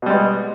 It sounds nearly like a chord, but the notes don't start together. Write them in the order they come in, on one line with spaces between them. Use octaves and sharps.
B2 G3 G#3 B3